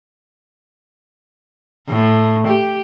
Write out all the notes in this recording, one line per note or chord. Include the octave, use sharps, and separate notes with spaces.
A2
G4